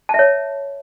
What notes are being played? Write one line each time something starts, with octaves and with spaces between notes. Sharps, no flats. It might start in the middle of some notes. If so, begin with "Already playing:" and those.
C#5 E5 A5